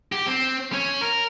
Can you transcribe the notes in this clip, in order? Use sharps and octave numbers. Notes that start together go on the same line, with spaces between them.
G4
C4
C#4
A#4